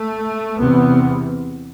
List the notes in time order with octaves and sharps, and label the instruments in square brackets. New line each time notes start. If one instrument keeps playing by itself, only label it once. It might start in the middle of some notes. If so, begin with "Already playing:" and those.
Already playing: [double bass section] A3
E2 C3 B3